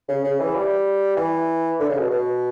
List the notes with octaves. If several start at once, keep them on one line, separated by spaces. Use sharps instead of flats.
C#3
C#3
E3
G3
E3
D3
C#3
B2
B2